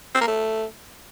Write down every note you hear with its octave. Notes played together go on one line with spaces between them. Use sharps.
C4
A#3
A3